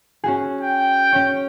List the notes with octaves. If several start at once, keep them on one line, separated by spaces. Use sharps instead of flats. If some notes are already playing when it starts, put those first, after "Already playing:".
C#4 F#4 G#4
G5
C#4 C#5